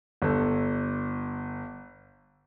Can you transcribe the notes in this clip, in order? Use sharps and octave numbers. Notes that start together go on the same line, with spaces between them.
G1 A4